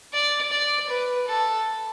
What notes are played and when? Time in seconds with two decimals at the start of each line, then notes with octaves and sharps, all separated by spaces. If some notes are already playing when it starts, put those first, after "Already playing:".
0.14 D5
0.52 D5
0.90 B4
1.28 A4